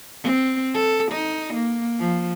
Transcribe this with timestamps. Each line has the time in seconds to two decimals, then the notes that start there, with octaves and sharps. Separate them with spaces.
0.23 C4
0.74 A4
1.11 D#4
1.53 A#3
1.99 F3